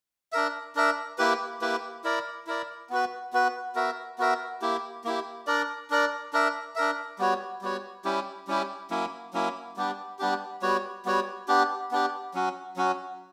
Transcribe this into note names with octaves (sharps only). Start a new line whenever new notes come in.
D4 A#4 E5
D4 A#4 E5
A#3 E4 G4 B4
A#3 E4 G4 B4
E4 A#4 D5
E4 A#4 D5
B3 F#4 B4
B3 F#4 B4
B3 F#4 A#4 E5
B3 F#4 A#4 E5
A#3 E4 G4
A#3 E4 G4
D4 A#4 D5
D4 A#4 D5
D4 A#4 E5
D4 A#4 E5
G3 B3 F#4 C#5
G3 B3 F#4 C#5
G3 C#4 E4 G4
G3 C#4 E4 G4
F#3 A#3 C#4 E4
F#3 A#3 C#4 E4
G3 B3 D4 G4
G3 B3 D4 G4
G3 B3 F#4 C#5
G3 B3 F#4 C#5
B3 D4 G4
B3 D4 G4
F#3 C#4 F#4
F#3 C#4 F#4